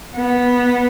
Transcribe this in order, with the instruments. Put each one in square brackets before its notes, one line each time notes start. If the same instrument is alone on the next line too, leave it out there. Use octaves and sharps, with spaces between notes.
[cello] B3